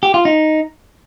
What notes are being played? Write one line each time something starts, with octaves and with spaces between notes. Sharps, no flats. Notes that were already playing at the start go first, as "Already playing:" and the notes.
G4
F4
D#4